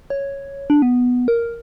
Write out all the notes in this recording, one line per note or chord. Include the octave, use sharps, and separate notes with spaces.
C#5
D4
B3
A#4